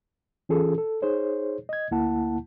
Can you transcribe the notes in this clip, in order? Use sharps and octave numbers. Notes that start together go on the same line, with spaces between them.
E3 C#4 F4 G#4 A4
A4
D#4 G#4 C5 C#5
D#5 G#6
D2 A#3 E4 F#5 A5